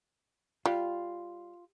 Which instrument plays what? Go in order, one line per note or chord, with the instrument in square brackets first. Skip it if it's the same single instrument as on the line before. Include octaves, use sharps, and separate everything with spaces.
[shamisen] G3 [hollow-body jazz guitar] F4